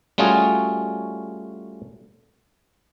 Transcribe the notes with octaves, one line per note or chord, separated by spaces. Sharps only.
G3 A3 C#4 F4 F#4 G#4